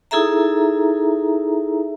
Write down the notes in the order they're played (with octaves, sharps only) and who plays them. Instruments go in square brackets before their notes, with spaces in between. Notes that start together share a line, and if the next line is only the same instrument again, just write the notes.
[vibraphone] D#4 E4 G#4 A4 E5 A#5